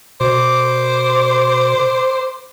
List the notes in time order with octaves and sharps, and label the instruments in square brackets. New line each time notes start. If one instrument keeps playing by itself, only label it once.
[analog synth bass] B2 [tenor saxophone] C5 [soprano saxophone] D6